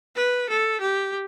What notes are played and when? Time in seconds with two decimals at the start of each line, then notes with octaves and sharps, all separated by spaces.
0.15 B4
0.49 A4
0.80 G4